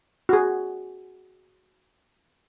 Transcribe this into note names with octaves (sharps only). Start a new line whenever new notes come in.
F#4 G#4